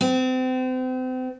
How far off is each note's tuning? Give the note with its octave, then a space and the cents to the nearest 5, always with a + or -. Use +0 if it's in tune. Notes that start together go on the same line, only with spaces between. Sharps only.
C4 -35